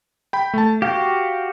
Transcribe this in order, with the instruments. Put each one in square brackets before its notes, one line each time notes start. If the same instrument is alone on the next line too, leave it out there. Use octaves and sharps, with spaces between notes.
[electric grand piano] G5 B5
A3 A5
[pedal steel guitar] F#4 G4 [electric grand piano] F5